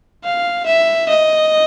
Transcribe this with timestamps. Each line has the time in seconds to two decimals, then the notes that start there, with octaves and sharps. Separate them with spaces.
0.24 F5
0.66 E5
1.09 D#5